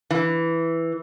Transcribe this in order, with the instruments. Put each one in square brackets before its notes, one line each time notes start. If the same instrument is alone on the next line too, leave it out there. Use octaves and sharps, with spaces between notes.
[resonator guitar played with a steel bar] E3